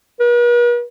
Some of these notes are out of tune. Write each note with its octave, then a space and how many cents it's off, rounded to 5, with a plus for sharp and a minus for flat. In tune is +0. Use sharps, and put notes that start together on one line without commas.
B4 -45